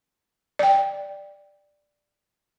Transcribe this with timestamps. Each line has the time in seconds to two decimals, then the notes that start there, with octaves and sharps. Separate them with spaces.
0.59 D5 G5